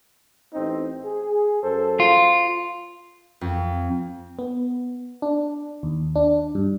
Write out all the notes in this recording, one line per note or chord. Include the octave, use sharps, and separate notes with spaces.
A1 C4 D#4
G#4
F#2 A4 C5
F4
F2
B3
D4
D#2
D4
G2